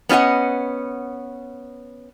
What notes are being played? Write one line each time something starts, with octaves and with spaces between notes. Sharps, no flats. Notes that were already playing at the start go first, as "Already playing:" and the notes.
B3 C#4 F4 D#5 F#5